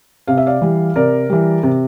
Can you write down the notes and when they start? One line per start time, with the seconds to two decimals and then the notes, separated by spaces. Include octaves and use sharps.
0.27 C3 F5
0.37 E5
0.46 D5 F5
0.62 E3 G3
0.96 C3 A#4 D5
1.30 E3 G3
1.63 C3